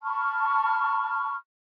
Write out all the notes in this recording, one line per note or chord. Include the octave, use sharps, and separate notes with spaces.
A5 B5 C#6 F6